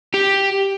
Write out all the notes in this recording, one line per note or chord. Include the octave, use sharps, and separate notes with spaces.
G4